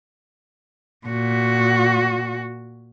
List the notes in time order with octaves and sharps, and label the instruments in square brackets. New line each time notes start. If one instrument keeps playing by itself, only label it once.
[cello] A#2 F#4